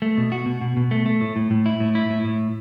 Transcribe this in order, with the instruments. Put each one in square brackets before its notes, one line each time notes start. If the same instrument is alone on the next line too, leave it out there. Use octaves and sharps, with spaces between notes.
[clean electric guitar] A3
B2
F#4
B2
B2
B2
A3
A3
A2
A2
A2
E4
A2
E4
A2
A2